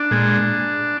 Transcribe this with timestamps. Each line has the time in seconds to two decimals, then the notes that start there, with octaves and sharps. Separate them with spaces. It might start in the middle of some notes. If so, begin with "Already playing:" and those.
Already playing: D4
0.11 A#2 G#3